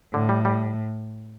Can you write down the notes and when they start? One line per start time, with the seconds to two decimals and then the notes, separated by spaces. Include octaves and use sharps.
0.13 A2 D3
0.29 G3
0.45 G3